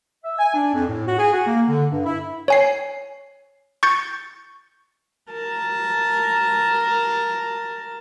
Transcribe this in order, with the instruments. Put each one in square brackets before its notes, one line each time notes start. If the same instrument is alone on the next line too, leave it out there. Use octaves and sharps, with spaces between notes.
[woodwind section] E5
G#5
D4
F2
A2
F#4
G#4
F#4
A#3
D3
G2
E4
[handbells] C#5 G#5 C7
C#6 G6 A6 C#7
[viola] A#4 A5